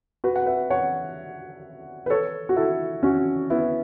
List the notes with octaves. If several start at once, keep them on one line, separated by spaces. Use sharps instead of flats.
F#4 B4
F#5
B4 E5
C#5 F#5
B4
A4 C#5
F#4
E4 A4
C#4 F#4
B3 E4